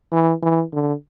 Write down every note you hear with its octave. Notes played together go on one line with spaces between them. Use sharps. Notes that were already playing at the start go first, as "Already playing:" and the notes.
E3
E3
D3